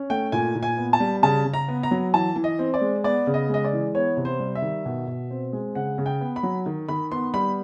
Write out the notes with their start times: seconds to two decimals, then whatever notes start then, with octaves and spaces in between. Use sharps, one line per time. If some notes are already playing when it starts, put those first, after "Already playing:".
Already playing: C#4
0.10 A3 G5
0.32 A#2 G#5
0.55 A#2
0.63 G#5
0.78 B3
0.93 A5
1.00 G3
1.23 C#3 A5
1.45 C#3
1.54 A#5
1.68 B3
1.83 A#5
1.91 F#3
2.13 E3 A5
2.36 E3
2.44 D#5
2.59 C4
2.74 D5
2.81 G#3
3.04 B3 D5
3.27 C#3
3.34 D#5
3.49 G#3 D#5
3.64 D5
3.72 E3
3.95 B3 C#5
4.17 C3
4.25 C5
4.40 G3
4.55 E5
4.62 D#3
4.86 B2
5.07 B2
5.31 C4
5.53 G#3
5.75 C#3 F#5
5.98 C#3
6.06 G5
6.21 B3
6.36 B5
6.43 F#3
6.66 D#3
6.89 D#3 B5
7.11 B3 C6
7.34 G3 B5